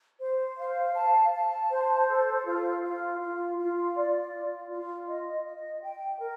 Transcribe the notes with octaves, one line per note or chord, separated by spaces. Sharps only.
C5
F5
A5
A5
C5
A4
F4
F4
F4
F4
D5
F4
F4
D#5
D#5
G5
A#4